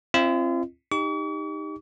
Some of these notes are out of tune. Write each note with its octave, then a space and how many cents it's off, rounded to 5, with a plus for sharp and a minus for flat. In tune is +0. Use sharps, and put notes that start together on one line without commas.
C4 +25 F4 -40 D#5 +0
D#4 +0 G4 +20 C#6 +45